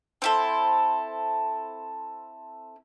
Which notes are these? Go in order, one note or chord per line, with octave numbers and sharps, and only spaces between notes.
C4 E4 A4